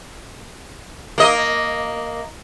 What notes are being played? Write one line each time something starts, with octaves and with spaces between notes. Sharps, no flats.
A#3 D#5